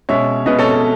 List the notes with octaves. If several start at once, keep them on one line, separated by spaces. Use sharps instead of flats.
B2 G#3 C#4 C#5 E5
B2 G#3 C#4 B4 D#5
A4 C#5
A4